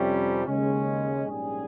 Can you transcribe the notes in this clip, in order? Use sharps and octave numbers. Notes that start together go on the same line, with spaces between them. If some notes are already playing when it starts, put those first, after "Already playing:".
Already playing: F2 C3 G3 C#4
D#2 C#3 G#3 C#4
A#1 G#2 G3 C#4 G#4